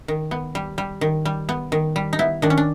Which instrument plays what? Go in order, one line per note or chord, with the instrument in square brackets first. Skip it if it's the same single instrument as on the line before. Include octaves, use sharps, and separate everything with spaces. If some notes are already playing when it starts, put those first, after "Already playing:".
[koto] D#3
B3
G3
G3
D#3
G3
B3
D#3
G3
D#4
B3 E4
D#3 D4
C#4
D4